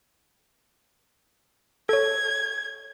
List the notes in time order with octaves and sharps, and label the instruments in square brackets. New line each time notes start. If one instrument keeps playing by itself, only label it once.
[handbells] A4 C#5 [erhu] G#6